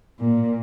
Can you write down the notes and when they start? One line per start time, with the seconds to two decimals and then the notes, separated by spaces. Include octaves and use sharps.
0.19 A#2